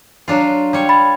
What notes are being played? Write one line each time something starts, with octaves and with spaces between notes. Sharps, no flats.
F#3 D4 F4
G3 C#5
B5 A6